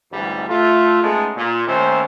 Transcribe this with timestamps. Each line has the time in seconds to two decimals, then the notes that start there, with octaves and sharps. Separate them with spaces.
0.12 A1 D2 G#2 E3 G3
0.48 A3 F4
1.03 G#3 A3 B3 C#4 D#4
1.36 A#2
1.67 D#2 D#3 A3 C#4 C5